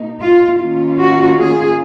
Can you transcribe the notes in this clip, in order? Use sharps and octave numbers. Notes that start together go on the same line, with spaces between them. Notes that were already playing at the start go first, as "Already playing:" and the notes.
Already playing: B2 A#3 D#4
F4
D#3 A#3 C#4 F4
F#4
G#4